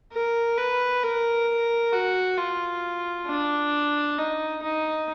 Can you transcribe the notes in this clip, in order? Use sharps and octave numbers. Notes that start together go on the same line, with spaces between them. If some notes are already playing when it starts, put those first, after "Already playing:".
A#4
B4
A#4
F#4
F4
D4
D#4
D#4